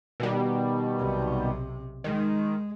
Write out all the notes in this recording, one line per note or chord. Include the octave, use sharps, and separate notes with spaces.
B2 D#3 G3
B1 C3
D#3 G#3